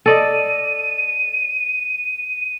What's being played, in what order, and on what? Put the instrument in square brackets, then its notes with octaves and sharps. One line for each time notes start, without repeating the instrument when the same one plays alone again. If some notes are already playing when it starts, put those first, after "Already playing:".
[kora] A4 D5 D#5 [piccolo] D#7